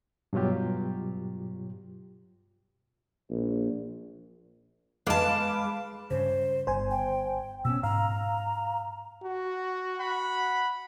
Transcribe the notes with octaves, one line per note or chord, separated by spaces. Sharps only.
G2 B2 F#3 F4 G4
A#1
G#3 B4 F5 A5 D6
G2 C#3 C5
G1 C5 G#5
G5
B2 B3 C#4 E6
G#2 F5 A#5
F#4
F#5 B5